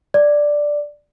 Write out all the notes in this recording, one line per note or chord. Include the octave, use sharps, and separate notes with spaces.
D5